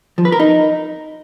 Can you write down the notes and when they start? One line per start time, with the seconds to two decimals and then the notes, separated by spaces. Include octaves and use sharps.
0.18 F3
0.25 B4
0.32 A#4
0.40 D#4